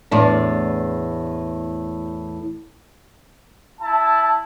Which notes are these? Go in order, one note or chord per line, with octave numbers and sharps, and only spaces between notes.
E2 A2 D4
E4 A5